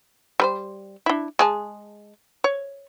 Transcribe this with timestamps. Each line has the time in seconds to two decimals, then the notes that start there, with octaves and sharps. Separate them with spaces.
0.40 G3 B4 C5
1.06 D4 E4
1.39 G#3 G#4 A5
2.44 C#5